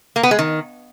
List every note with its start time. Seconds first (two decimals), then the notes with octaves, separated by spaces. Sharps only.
0.16 A#3
0.23 B3
0.31 G#3
0.39 D#3